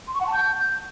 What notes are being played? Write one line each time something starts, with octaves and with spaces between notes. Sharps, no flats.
C6
C#6
F#5
A5
G6